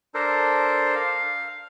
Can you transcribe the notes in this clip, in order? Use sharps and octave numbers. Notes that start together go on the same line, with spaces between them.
D4 A4 A#4 C5
F5